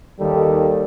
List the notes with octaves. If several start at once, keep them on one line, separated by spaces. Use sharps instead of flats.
D#2 D#3 G3 A4